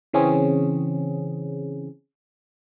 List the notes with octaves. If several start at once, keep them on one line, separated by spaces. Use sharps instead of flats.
C#3 E3 C4 C#4 G#4